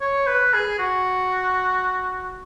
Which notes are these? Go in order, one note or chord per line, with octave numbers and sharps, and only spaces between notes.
C#5
B4
G#4
F#4